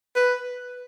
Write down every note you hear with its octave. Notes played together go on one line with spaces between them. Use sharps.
B4